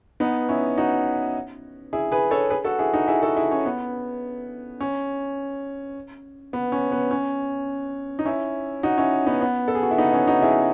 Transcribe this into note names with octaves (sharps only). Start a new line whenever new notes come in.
B3 D#4
C#4 E4
D#4 F#4
E4 G#4
G#4 B4
A4 C#5
G#4 B4
F#4 A4
E4 G#4
D#4 F#4
E4 G#4
F#4 A4
E4 G#4
C#4
B3
C#4
B3
C#4
B3
C#4
D#4
C#4 E4
D#4 F#4
C#4 E4
B3 D#4
B3
A4
G#4
F#4
E4
B3 D#4
C#4 E4
D#4 F#4
E4 G#4